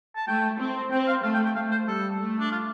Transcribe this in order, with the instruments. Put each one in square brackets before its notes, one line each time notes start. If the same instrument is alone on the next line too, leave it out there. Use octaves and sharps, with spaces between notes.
[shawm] A5
[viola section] A3 [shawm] G5
[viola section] C4
[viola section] C4 [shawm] G5
[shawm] F5
[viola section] A3 [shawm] F5
[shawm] G5
G5
[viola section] A3 [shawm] F5
[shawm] C5
[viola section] G3 [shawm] A4
[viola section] A3
[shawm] D4
F4